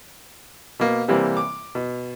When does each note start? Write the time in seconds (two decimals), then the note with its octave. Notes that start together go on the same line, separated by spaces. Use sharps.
0.79 B2 A#3
1.08 C3 E3 G3 A#3 C4
1.37 D6
1.75 B2